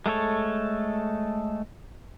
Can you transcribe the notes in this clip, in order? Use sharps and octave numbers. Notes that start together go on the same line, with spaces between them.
G#3 A3 A4 C#5